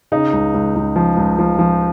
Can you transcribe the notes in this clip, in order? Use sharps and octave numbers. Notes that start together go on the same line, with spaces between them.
C#3 D#4
C#2
C#2
C#2
F3
C#2
F3
F3